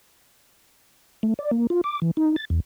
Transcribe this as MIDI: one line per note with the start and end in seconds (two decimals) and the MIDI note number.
1.23 1.34 57
1.39 1.51 74
1.51 1.67 58
1.70 1.81 65
1.84 2.00 86
2.02 2.11 52
2.17 2.36 63
2.36 2.45 93
2.50 2.60 40